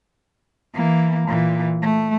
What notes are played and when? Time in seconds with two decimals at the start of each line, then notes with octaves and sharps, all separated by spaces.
0.74 E3 A#3
1.29 A#2 E3
1.82 A3